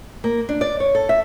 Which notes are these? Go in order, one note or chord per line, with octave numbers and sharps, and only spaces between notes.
A#3
D4
D5
C#5
A4
E5